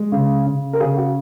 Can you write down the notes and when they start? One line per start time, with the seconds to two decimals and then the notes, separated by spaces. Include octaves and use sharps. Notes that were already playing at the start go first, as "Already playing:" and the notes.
Already playing: G#3
0.12 C#3
0.46 C#3
0.73 A#4
0.80 C#3 G#4
0.97 F#4